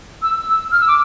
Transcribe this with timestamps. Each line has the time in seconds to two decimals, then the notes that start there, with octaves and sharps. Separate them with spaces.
0.22 E6
0.48 E6
0.72 F6
0.81 E6
0.88 D6